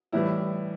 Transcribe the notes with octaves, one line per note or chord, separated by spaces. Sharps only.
A2 E3 G3 E4